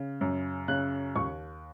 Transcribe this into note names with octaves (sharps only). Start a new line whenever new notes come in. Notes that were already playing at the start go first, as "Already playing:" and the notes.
Already playing: C#3
F#2
C#3 F#6
D#2 C#6